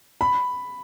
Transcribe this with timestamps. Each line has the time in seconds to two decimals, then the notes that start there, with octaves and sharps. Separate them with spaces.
0.21 B5